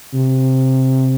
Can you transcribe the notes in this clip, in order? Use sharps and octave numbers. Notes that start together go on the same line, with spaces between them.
C3